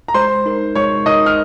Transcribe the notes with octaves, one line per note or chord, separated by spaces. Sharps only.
A#5
G#3 C5 C6
D#4 A#4
G#3 C#5 C#6
D#4 A#4 D#5 D#6
F6